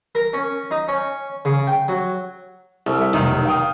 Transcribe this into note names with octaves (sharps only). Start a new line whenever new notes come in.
A#4
C#4
D#4
C#4
C#3
G5
F#3
C2 A4
E5
F1 B1 D#3
F5 G5 D#6